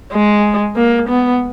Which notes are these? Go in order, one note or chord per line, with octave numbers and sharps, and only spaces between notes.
G#3
A#3
B3